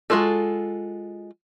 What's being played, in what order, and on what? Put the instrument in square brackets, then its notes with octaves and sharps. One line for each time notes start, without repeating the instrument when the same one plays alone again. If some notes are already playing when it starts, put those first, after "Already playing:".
[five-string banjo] G#3 C#4 F4 F#4 A4